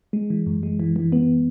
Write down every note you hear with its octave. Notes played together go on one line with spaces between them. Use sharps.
G#3
E3
F#2
G#3
E3
E3
B3